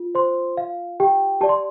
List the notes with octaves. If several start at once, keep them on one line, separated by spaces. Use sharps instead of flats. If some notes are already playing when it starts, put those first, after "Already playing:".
Already playing: F4
C5 C6
F5
G4 G5
G4 D5 A5
C6